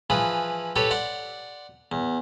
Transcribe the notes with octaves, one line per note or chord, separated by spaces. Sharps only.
E3 F3 G#4 B4
G4 A4 B4 C#5
D5 F#5 C6
E2